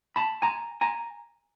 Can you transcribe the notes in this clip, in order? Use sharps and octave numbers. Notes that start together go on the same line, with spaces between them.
A5 B5
G#5 A#5
G#5 A#5